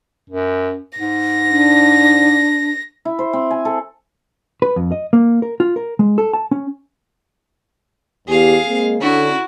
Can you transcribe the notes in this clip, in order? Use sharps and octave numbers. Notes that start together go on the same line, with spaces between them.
F#2
G#2 A#6
D4
E4
C5
C4
G#5
A4
B4
F2
D#5
A#3
A#4
F4
A#4
G#3
A4
A5
C#4
E2 G4 G#4 F5
G#3 A#3 C4
D3 C#4 E4 F#4